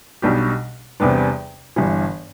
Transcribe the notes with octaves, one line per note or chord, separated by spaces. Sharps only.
B1 B2 G3 D4 G4
E2 C3 G3 B3 D4
G1 G2 E3